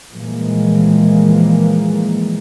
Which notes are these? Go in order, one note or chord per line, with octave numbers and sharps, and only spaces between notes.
A#2 E3 F3 G3 G#3 A#3